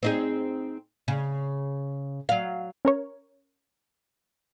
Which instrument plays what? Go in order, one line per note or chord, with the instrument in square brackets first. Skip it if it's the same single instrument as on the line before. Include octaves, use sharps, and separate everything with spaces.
[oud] C4 D#4 G#4
C#3
F#3 F5
[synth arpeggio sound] C#4 A#4 C#5